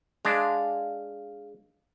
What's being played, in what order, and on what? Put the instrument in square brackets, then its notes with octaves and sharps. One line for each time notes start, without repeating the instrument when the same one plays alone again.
[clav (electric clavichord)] G#3 D4 [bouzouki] F5